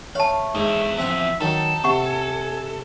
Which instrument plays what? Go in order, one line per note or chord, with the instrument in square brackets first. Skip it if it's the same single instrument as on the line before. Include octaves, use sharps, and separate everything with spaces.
[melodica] A3 [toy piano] C#5 A5 [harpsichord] F5
[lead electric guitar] E2 E4 [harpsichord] G#2
[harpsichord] F3 C4 F#5 [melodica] E5
[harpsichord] D#3 F#3 [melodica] D#4 A5 [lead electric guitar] A4
[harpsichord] C3 [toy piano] F#5 C#6
[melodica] G#5